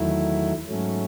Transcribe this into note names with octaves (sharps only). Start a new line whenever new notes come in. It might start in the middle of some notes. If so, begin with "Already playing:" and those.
Already playing: E2 D#3 F#3 A3 E4
G#2 F#3 A3 C#4